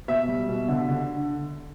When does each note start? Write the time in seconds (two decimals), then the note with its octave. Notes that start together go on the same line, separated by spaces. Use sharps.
0.08 B2 E5
0.28 G3
0.48 B2
0.68 D3
0.89 D3